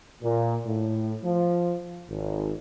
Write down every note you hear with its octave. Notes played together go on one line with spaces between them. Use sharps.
A#2
A2
F3
G#1